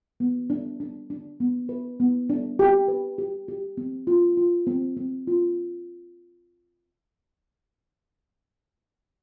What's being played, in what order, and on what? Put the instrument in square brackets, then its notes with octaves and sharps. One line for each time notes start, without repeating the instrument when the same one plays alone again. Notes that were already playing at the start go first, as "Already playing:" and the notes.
[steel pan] B3
D4
D4
D4
B3
B4
B3
D4
G4
B4
G4
G4
C4
F4
F4
C4
C4
F4